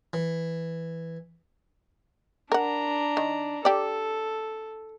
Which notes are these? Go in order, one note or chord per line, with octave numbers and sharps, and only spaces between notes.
E3
D4 A#4 F#5 A#5
D#3
G4 A4 D5